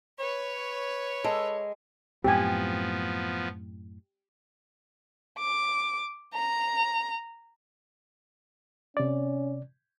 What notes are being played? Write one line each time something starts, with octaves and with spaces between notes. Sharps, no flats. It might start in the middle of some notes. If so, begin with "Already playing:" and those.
B4 C#5
G#3 A4
F#2 A2 F3 B3 C4 G4 G#5
D6
A#5
C3 C#4 D5